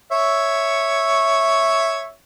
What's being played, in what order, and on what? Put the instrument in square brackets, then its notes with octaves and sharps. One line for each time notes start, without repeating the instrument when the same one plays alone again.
[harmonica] C#5 E5